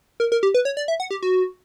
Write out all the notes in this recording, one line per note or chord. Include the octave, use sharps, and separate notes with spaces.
A#4
A#4
G4
B4
C#5
D5
E5
F#5
G4
F#4